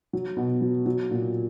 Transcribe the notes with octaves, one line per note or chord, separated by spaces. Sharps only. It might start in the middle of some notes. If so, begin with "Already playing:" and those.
F#3
B2
F#3
F#3
A#2